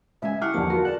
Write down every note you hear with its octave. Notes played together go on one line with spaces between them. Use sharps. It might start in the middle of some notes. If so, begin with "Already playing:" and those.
C#2 E5 G#5
G3 E4 F#5 C#6 D6 F6 F#6
E2 D3 F3 A#3 G4 A5
F4 F#4 A#4 B4
G#4 D5 A5 F#6